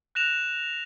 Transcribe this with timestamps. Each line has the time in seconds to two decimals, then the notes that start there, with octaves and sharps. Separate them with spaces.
0.15 F#6 A#6 E7 F7